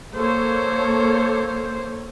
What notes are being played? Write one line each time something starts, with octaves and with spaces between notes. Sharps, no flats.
A#3 A4 C5 C#5